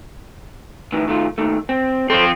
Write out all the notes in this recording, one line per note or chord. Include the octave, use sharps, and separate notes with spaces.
A2 D#3 E3
D#3 A3 F4
D#2 D#3 A3
C4
F3 C4 A4 C5 C#5